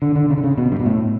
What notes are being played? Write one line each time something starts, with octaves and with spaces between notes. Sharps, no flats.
D3
D3
C#3
D3
C#3
B2
G2
B2
A2